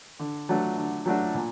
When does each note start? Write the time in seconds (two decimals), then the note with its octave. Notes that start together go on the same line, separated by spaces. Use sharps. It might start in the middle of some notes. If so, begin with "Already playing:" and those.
0.19 D3
0.49 F#3 A3 D4 F#4
0.77 D3
1.06 F#3 A3 D4 F#4
1.34 A#2